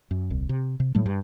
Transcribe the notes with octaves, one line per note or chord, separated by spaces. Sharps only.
F#2
D#1 C2
C3
C3
A2 F#3 G3 A3
G2